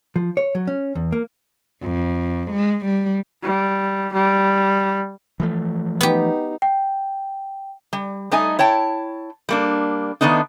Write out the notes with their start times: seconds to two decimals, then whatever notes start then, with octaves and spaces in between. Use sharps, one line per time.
0.16 F3
0.37 C#5
0.55 F#3
0.67 C#4
0.95 E2
1.12 A#3
1.83 F2
2.51 G#3
2.85 G3
3.43 G3
4.13 G3
5.40 E3 F3 A3
6.01 B3 D#4 G4
6.62 G5
7.93 G3
8.31 G3 A3 D#4 D#5 G#5
8.59 E4 C#5 G5 A5
9.49 G3 A#3 D4
10.21 D#3 A3 B3 D4 D#4